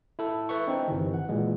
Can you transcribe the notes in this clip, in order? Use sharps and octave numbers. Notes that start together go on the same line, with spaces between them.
E4 A4
B4 E5 C#6
C4 D4 D#4
G1 C3 D#3 E3
F#5
A#2 E3 G#3